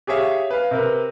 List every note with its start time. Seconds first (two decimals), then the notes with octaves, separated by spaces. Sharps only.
0.07 G4 G#4 C#5 E5 F5
0.50 B4 F5
0.71 C3 A#4 B4